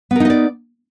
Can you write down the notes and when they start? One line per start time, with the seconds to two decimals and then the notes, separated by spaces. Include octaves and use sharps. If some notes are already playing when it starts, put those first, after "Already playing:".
0.11 B3
0.16 A#4
0.20 D#4
0.25 D#5
0.30 D5